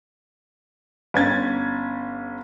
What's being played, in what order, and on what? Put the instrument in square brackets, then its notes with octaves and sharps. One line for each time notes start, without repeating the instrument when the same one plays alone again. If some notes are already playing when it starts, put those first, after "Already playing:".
[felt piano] G1 C#4 G#6 A6